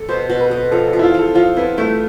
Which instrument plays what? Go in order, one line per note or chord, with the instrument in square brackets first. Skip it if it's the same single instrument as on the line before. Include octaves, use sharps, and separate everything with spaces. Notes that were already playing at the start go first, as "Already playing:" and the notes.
Already playing: [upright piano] A4
[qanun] B2 [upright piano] C5
[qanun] B2
[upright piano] B4
[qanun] B2
[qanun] F3 [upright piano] A4
[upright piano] A4
[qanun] F3
[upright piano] E4
F4
[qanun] F3
[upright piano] A4
[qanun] F3 [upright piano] F4
[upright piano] B3 [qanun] E4
[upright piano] A3 [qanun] E4